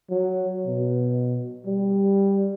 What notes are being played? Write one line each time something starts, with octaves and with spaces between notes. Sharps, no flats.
F#3
B2
G3